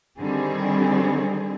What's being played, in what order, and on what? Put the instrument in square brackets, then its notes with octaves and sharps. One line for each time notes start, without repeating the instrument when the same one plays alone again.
[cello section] D3 D#3 G3 C4 G#4